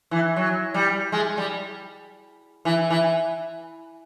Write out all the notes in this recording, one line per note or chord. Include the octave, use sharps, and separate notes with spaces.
E3
F#3
G3
G#3
G3
E3
E3